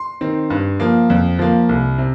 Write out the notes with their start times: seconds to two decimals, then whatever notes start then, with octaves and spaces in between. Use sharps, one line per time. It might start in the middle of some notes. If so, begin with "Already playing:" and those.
Already playing: C6
0.21 D#3 C4
0.50 G2
0.80 F3 A#3
1.10 F2
1.39 F3 A#3
1.69 C2
1.98 C3